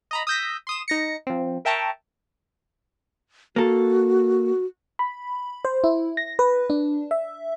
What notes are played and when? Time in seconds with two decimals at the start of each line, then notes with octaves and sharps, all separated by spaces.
0.11 D#5 A#5 B5
0.27 D#6 E6 G6 A#6 B6
0.67 C6 D#6 E7
0.88 D#4 A#6 C#7
1.27 F3 C4
1.65 A#4 E5 G5 A5 A#5 C#6
3.56 A#3 F#4 A4
4.99 B5
5.65 C5
5.84 E4
6.17 A#6
6.39 B4
6.70 D4
7.11 E5